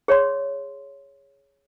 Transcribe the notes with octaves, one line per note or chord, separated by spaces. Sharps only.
G#4 C#5 D5 C6